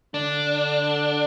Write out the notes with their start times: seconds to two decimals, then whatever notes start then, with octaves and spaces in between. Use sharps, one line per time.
0.14 D3 D4